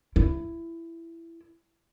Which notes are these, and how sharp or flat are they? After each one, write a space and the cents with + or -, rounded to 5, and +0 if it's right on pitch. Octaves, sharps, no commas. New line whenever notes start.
E4 +15